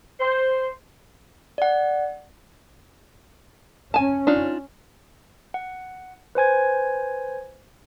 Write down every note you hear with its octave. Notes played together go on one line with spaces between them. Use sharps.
C5
D5 F#5
C#4 G#5 A5
D4 D#4 F4
F#5
B4 C5 G#5 G#6